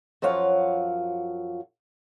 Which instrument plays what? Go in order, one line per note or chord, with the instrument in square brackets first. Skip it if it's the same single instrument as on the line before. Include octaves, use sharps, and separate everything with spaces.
[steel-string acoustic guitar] F#2 F3 F4 C#5 F5 F#5